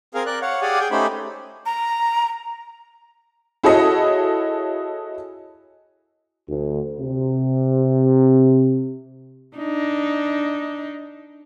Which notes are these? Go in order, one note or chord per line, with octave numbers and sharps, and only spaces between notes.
C4 G#4 A#4 F5
A#4 D5 F#6
C#5 F5 F#5
G4 G#4 D5 F5 F#5 G#5
G#4 G5
A3 C#4 D#4 G4 C5 B5
A#5
E4 F#4 G#4 A4 C#5 D#5
D2
C3
D4 D#4